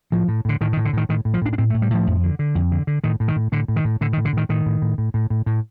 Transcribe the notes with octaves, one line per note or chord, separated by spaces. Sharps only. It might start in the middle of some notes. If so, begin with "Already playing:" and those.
A2 F3
A2
A2 D3
A2 D#3
D#3
A2
D3
A2 D#3
A2 D#3
A2
F3
A2 D4
D4
A2 C4
A3
A2
G3
A2 F3
F2
D3
D3
F2
D3
D3
A2 D#3
A2
D#3
A2
A2 D3
A2
D#3
A2
A2 D3
D#3
A2
D3
A2 D#3
A2 D#3
A2
A2
A2
A2
A2
A2